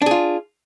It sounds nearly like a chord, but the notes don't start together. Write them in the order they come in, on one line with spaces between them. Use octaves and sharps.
D4 G#4 F4